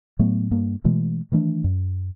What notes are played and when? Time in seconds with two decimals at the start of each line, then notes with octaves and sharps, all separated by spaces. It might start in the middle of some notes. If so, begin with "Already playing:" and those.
0.19 A2 F#3 A3 B3
0.51 G2 A#3
0.84 B2 E3 G#3 A3
1.32 D#3 E3 A3 D4
1.64 F#2